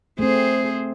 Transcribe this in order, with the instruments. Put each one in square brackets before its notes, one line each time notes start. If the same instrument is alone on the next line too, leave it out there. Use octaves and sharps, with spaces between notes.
[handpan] A3 C4 [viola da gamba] G#4 C5